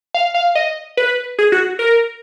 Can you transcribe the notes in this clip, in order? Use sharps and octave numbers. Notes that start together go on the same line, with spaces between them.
F5
F5
D#5
B4
G#4
F#4
A#4